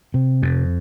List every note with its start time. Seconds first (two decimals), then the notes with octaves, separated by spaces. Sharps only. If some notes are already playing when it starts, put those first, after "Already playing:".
0.14 C3
0.42 F2